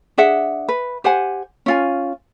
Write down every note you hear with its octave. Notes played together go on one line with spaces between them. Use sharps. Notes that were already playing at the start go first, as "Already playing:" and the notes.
D4 G#4 E5 F#5
B4
G4 C5 F#5 G#5
C#4 F4 G#5